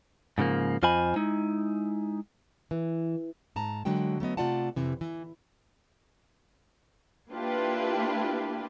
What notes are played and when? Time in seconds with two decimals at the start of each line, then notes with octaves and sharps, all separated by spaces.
0.38 G#2 C#3 F3 A#3
0.83 F2 F4 C5 D#5 G#5 B5
1.16 G#3 D#4 E4
2.71 E3
3.56 G#2 A5 A#5
3.85 D3 F#3 G#3 F#4 G5
4.20 F#3 A3 B3 D#5
4.37 C3 A3 F4 D5 F#5 A5
4.76 F2 C3 E3
5.01 E3
7.30 A#3 D4 E4 F4 G4 B4